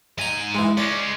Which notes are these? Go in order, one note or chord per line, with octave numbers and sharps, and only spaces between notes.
G#2 D#5 G#5 A#5
E3 G#3
G#3 C#4 D5